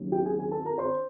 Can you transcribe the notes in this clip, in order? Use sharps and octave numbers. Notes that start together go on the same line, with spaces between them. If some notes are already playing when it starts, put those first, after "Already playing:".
Already playing: D#2 C#3 F#3
G4 G5
G#4 G#5
G#4 G#5
A4 A5
A#4 A#5
C5 C6